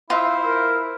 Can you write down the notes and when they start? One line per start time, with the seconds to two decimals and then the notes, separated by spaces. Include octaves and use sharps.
0.10 E4 F4 C5 E5
0.43 A#4